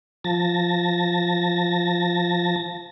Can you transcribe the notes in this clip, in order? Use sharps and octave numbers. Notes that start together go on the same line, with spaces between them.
F3 A5 A6 A#6